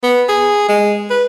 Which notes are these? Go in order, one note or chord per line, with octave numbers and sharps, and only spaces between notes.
B3
G#4
G#3
B4